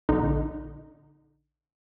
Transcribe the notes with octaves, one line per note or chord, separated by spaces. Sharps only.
A#1 D3 D#4